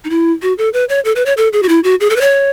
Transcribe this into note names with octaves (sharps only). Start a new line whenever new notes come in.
D#4
E4
F#4
A4
B4
C#5
A4
B4
C#5
A4
G#4
F#4
E4
F#4
G#4
A4
B4
C#5